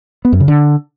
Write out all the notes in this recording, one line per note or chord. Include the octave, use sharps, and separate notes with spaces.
B3
F#2
C#3
D3